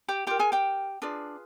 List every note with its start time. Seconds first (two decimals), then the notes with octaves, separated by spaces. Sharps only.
0.08 G4 G5
0.27 F4 G4 A#4 G5
0.39 G#4 G#5
0.52 G4 G5
1.02 D4 F4 G#4 B4 D5